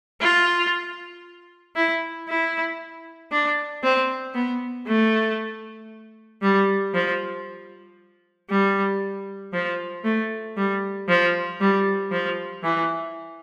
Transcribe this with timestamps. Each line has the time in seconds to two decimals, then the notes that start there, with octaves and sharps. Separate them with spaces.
0.21 F4
1.76 E4
2.29 E4
3.32 D4
3.83 C4
4.35 B3
4.87 A3
6.42 G3
6.94 F3
8.50 G3
9.53 F3
10.04 A3
10.57 G3
11.09 F3
11.60 G3
12.12 F3
12.64 E3